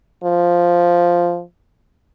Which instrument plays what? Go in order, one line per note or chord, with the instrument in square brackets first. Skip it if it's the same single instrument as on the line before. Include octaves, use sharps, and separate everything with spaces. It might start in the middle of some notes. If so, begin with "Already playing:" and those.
[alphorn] F3